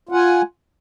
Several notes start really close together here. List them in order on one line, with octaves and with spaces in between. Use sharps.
F4 F#5 G#5